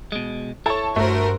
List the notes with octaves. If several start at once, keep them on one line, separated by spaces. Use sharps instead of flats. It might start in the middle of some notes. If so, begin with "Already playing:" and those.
B2 G#3
E4 A4 C#5 A5
G2 A3 F#4 A#4 C5